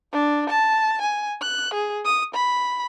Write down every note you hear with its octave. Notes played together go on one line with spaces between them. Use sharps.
D4
A5
G#5
F#6
G#4
D#6
B5